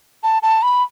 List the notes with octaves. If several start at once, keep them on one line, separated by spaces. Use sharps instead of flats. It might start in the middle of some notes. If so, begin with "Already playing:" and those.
A5
A5
B5